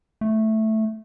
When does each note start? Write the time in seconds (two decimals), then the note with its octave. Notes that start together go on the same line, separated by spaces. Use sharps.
0.21 A3